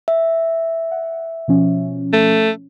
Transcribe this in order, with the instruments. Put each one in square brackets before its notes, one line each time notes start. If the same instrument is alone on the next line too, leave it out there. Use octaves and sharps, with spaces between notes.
[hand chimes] E5
[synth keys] F#5
B2 F3 C#4
[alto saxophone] A3